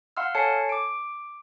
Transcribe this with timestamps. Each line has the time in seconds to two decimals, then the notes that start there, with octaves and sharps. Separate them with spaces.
0.17 F5 F#5 C6 E6 F6
0.35 A4 C#5 G#5 A5 C7 C#7
0.69 D6 D7